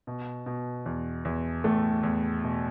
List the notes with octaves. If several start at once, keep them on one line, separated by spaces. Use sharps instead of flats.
B2
B2
E2
E2
E2 A2 A3
E2
B2